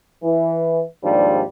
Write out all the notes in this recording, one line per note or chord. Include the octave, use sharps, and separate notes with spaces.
E3
D#2 G#2 F3 G3 D4